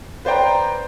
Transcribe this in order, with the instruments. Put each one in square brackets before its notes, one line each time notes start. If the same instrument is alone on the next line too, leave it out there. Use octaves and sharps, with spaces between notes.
[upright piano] B4 C5 D5 G5 A#5